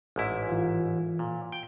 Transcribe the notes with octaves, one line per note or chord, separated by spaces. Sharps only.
A1 G#2 E4
E3 F4
A#2
G5